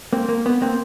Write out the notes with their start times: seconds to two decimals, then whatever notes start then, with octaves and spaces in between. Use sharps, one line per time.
0.13 A#3 C4
0.29 A#3
0.46 B3
0.62 A#3 C4